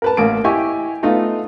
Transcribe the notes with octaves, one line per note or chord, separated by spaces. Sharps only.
A#4 B4 A5
A1 A#3 D7
E4 G4 D#5 G#5 C#6
A3 B3 D#4 F4